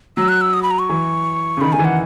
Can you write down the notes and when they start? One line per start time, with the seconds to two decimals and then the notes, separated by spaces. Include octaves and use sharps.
0.17 F#3 E6
0.29 F#6
0.41 E6
0.53 D#6
0.63 B5
0.71 A#5
0.80 C#6
0.89 E3
1.57 C#3
1.61 D#3 B5
1.73 D#3 G#5
1.79 E3
1.85 F#5